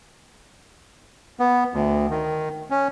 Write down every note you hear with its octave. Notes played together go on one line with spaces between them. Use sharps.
B3
D2
D#3
C#4